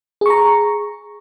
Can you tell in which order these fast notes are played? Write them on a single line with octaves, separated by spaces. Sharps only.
G#4 C#6 A#5